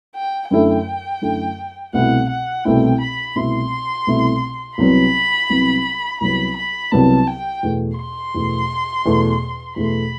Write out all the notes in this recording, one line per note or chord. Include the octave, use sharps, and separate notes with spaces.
G5
F#2 D3 A3 E4 A4 G5
F#2 D3 A3 E4 A4
C2 B2 A3 C4 E4 F#5
F#5
C2 B2 A3 C4 E4 G5
B5
C2 B2 A3 C4 E4 C6
C2 B2 A3 C4 E4
C2 C3 F#3 B3 B5
C2 C3 F#3 B3
C2 C3 F#3 B3 B5
B5
C2 C3 F#3 B3 A5
G5
E2 B2 A3
C6
E2 B2 A3
E2 B2 A3
E2 B2 A3 B5